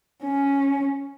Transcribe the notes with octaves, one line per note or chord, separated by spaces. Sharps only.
C#4